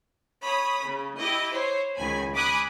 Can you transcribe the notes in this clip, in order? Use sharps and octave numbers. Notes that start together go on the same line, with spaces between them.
C#5 B5 D#6
C#3
E4 G4 D#5 D6
C5 C#5
C#2 D#3 G#5 B5
G#5 B5 D6 D#6 F#6